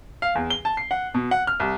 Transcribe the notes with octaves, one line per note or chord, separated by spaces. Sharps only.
F5
E2
G7
A5
C7
F#5
B2
F#5
F6
C2